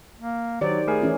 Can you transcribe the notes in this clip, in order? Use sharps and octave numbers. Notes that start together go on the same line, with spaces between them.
A#3
D#3 F#3 G4 C5 D5
A3 G#4 A#4 G#5
E3 C#4 E4